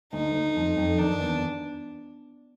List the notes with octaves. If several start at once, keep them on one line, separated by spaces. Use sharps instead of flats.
D2 D#4
D2
F2
F2
D#3 D4
E2